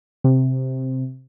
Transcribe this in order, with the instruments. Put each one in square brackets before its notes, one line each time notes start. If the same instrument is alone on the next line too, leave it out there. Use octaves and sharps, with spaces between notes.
[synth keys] C3